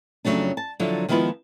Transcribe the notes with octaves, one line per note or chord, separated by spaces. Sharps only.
F2 C#3 F#3 A3 D4
A5
D3 F3 F#3 E4
D#3 F3 G#3 B3 E4 F4